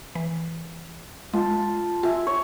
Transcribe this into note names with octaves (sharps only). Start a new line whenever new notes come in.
E3
G#3 F4 A5
F4 E5 G#5
C#5